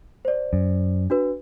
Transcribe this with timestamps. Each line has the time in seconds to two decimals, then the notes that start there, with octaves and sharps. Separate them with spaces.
0.25 C5 D5
0.53 F#2
1.10 D4 F#4 B4